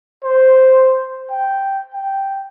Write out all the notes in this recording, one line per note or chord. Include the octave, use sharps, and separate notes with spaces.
C5
G5
G5